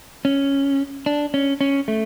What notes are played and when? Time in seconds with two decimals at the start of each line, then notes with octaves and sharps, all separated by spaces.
0.25 C#4
1.06 D4
1.34 C#4
1.61 C#4
1.88 A3